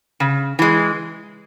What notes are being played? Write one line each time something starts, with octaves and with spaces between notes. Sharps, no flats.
C#3
E3 G#3